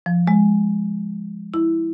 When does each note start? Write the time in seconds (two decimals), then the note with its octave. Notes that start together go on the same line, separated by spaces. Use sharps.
0.06 F3
0.27 G#3
1.54 E4